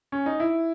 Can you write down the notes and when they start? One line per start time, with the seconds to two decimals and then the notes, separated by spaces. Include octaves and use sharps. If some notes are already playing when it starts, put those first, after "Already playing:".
0.12 C#4
0.26 D#4
0.40 E4